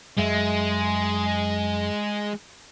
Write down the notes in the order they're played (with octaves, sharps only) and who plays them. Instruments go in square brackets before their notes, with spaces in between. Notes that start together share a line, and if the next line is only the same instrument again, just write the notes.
[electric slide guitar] F#2 E5 [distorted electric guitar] G#3